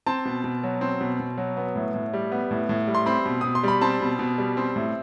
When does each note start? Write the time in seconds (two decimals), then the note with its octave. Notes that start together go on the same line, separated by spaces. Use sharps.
0.06 C4 A5
0.25 B2
0.44 B2
0.64 F#3
0.81 C4
1.01 B2
1.20 B2
1.38 F#3
1.57 B3
1.75 A2
1.94 A2
2.13 G3
2.32 B3
2.51 A2
2.69 A2
2.87 G3
2.95 C6
3.06 C4 B5
3.26 B2
3.41 B2 D#6
3.55 C6
3.63 G3 B5
3.81 C4 A5
4.01 B2
4.19 B2
4.38 G3
4.57 C4
4.76 A2